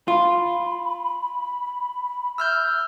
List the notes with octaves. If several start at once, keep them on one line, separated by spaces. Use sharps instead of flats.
F4 B5
E5 E6 F6 G6